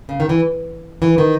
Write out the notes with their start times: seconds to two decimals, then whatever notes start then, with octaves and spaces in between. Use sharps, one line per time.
0.09 C#3
0.20 D#3
0.29 E3
1.02 E3
1.18 D#3